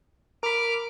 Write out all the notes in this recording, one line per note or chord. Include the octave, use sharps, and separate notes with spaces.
A#4 B5 D6 F6